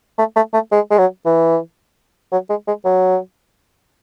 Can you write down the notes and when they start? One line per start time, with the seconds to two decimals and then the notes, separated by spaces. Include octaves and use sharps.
0.19 A3
0.36 A3
0.54 A3
0.72 G#3
0.91 G#3
0.98 F#3
1.25 E3
2.32 F#3
2.50 G#3
2.67 G#3
2.85 F#3